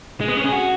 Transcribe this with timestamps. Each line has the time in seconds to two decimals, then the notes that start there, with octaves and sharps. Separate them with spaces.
0.21 G#3
0.28 B3
0.37 C#4
0.44 G#4
0.52 F#4